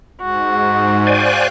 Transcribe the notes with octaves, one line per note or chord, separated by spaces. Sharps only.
G#2 F#4
C5 D5 F5 G5 G#5 F#6